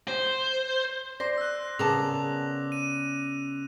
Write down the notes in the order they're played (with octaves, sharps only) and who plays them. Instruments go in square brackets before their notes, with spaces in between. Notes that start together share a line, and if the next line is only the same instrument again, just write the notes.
[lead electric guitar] C5
[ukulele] C5 [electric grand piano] D5 C6 [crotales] A#6
[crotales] E6 F#6
[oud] C#3 B3 [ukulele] G#4 A#4 A5 [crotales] D6 F7
[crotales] D#7